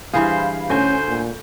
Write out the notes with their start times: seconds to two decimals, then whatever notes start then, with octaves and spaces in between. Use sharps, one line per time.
0.13 G2 E3 G#4 C5 F5 B5
0.69 D2 C#4 F#4 C5 G#5 G6
1.08 A#2